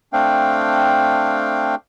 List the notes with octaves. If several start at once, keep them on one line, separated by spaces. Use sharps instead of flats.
A3 C4 D4 F5 G5